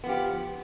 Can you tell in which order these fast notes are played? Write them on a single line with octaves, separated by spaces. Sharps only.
B3 F3 G4